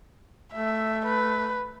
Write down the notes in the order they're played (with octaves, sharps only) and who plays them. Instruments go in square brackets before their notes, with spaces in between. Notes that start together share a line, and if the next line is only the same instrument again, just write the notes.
[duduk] A3 [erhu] E5
[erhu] B4